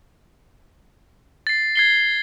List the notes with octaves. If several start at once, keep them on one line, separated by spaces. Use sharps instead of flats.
A6 C7
G#6 C7 G7